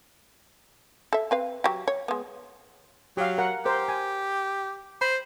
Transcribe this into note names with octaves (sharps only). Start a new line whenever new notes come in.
A4 E5
C4 B4 F5
F#3 G4
C#5
G#3 B3
F#3 G4 F5
A#4 F#5
G4 A#4 C5
G#5
C5 B5